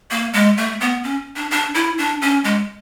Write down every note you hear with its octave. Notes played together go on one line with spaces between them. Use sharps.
A#3
G#3
A3
B3
C#4
D4
D4
E4
D4
C#4
G#3